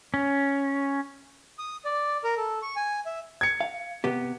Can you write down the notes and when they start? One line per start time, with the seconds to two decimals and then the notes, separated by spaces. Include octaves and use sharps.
0.14 C#4
1.59 D#6
1.85 D5
2.24 A#4
2.37 A4
2.62 C#6
2.76 G#5
3.06 E5
3.41 G#6 C#7
3.61 F5
4.04 C3 B3 G4